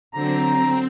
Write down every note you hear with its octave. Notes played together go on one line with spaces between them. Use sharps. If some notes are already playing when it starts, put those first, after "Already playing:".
D3 F#3 C4 A#5